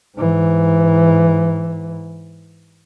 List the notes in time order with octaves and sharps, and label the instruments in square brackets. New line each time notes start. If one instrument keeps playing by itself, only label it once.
[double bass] G#2 E3